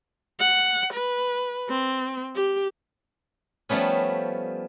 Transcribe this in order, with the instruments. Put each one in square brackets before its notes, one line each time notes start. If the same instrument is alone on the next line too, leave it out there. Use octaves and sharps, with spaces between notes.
[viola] F#5
B4
C4
G4
[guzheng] F3 G3 A3 B3 C#4